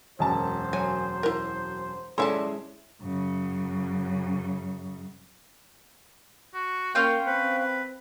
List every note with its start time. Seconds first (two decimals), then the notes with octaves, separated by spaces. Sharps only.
0.19 E1 F#2 C5 A5
0.73 F#3 G#5
1.23 E4 A#4
2.18 G#3 C#4 E4 A4 D5 E5 A5 C6
3.02 F#2 C#3
6.54 F#4
6.95 A#3 C#4 F4 G5
7.26 C4 B4
7.58 B4